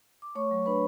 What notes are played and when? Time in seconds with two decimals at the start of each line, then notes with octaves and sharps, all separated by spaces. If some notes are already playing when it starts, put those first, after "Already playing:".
0.22 D6
0.35 A3 C#5 C#6
0.51 F#3
0.66 D4 B4 B5